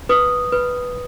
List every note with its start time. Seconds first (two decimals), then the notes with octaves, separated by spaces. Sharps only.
0.09 B4 D#6
0.52 B4